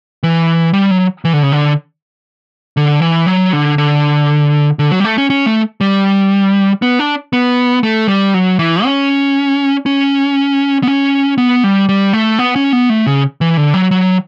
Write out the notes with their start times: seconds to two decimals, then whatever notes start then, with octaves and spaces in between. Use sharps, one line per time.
0.23 E3
0.73 G3
0.91 F#3
1.25 E3
1.33 D3
1.43 C#3
1.52 D3
2.77 D3
3.02 E3
3.27 F#3
3.53 D3
3.78 D3
4.79 D3
4.92 F#3
5.00 G3
5.04 A3
5.18 C#4
5.30 C#4
5.46 A3
5.81 G3
6.82 B3
6.99 D4
7.33 B3
7.83 A3
8.08 G3
8.34 F#3
8.59 E3
8.84 C#4
9.86 C#4
10.83 B3
10.87 C#4
11.38 B3
11.64 G3
11.89 G3
12.13 A3
12.39 B3
12.56 C#4
12.73 B3
12.90 A3
13.07 C#3
13.41 E3
13.57 D3
13.74 F#3
13.91 F#3